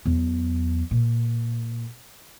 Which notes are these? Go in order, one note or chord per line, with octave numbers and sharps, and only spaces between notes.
E2 F#3
A#2